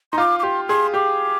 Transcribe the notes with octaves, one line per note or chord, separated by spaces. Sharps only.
D#4 C6
F4 D6
D6
G4 C6
G#4 C6
G4 D6